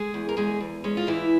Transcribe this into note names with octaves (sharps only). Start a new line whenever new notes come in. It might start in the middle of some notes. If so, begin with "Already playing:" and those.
Already playing: G#3 G#4
E2
A#4
E2 G#3 G#4
E2
G#3 C#4
F4
E2 E3 E4